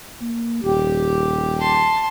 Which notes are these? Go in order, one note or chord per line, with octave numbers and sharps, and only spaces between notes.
A#3
D#1 G4
A5 C6